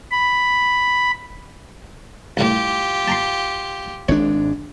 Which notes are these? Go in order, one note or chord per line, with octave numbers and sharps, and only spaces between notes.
B5
C2 A2 F4 G4
A5 A#5 C6
G#1 G#2 D4 C#5